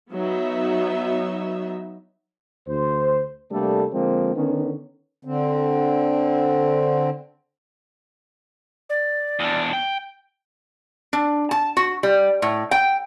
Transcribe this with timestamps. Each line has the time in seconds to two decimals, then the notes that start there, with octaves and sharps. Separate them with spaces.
0.11 F#3 B3 D#4 E5
2.67 D2 C5
3.51 C3 G3 A3 A#3 D4 A4
3.92 D3 F3 G#3 A#3 C4
4.35 D3 D#3 B3 C#4
5.25 D3 C4
8.90 D5
9.40 E2 D4
9.73 G5
11.13 D4
11.51 A5
11.77 F#4
12.03 G3
12.42 A2
12.71 G5